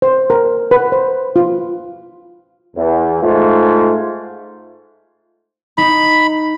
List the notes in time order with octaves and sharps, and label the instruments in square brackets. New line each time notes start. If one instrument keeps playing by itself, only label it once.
[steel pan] C5
A#4
B4
C5
F4
[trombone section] E2
G#2 A3 F4
[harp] D#4 [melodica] B5